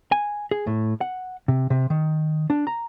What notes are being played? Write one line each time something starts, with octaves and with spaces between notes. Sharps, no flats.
G#5
G#4
A2
F#5
C3
C3
D#3
D4
A#5